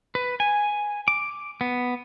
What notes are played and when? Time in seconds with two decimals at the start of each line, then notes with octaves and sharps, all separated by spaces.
0.15 B4
0.40 G#5
1.08 D6
1.61 B3